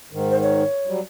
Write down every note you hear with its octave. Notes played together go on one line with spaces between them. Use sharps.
G#2 D#3
C5
C#5
F#3 G3